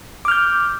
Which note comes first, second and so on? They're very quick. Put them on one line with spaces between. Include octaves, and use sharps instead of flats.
D6 F6 G6